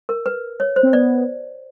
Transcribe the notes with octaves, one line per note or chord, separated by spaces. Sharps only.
A#4
B4
C#5
C5
C4
B3 D5